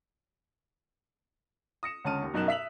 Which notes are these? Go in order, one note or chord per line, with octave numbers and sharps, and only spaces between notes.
D#6 A#6 C#7 E7
C#2 D3 C#4 A5 F6 D#7
D#2
B1 F#2 D#4 A#4 F#6 E7
E5 E6 B6 F7 F#7